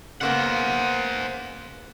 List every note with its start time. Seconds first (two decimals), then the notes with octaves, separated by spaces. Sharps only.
0.21 C#3 A#3 B3 C5 F#5